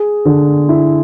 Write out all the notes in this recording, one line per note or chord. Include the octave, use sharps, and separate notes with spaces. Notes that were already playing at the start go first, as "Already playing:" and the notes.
Already playing: G#4
D3
E4